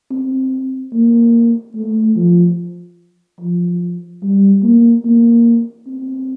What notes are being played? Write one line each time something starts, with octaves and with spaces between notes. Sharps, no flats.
C4
A#3
A3
F3
F3
G3
A#3
A#3
C4